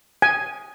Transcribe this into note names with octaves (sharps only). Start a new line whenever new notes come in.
G#5